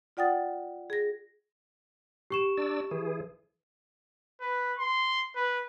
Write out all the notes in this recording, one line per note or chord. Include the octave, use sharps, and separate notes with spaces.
F4 D5 F#5 G5 D#6 A6
G#4 A#6
G4 C#6 E7
D4 D5 E6
E3 G#4
B4
C6
B4